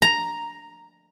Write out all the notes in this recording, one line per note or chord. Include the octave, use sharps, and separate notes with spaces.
A#5